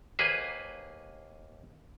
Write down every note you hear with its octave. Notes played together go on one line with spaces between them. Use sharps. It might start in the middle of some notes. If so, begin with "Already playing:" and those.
D#2 A#3 G#4 B4 C5